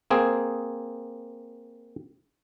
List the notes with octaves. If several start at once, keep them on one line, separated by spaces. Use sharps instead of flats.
A#3 C4 G#4